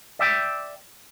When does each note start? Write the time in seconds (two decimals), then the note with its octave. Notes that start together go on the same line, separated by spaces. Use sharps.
0.19 D5 E5 G5